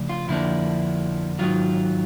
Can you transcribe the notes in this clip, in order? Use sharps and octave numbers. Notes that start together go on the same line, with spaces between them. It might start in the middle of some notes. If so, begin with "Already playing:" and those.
Already playing: C#3 F3 A3 D4
F4
F2 D3 F3 A#3 D4 E4
G#2 D#3 F#3 F4